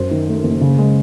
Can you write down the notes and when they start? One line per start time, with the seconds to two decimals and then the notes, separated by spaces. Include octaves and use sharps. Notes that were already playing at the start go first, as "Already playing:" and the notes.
Already playing: F#2 C5
0.11 D#3
0.28 A3
0.44 F#1
0.61 C#3
0.78 G#3